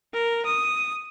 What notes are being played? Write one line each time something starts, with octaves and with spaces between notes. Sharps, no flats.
A#4
D#6